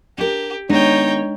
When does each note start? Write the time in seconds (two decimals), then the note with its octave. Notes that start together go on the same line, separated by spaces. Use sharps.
0.18 D4 G4 A#4
0.69 D#3 G#3 B3 D4 D#4 C#5 G5